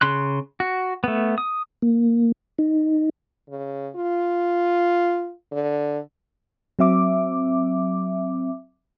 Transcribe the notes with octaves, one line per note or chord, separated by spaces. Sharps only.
C#3 C6 F#6
F#4
A3 B3
D#6
A#3
D#4
C#3
F4
D3
F#3 C4 E5 D6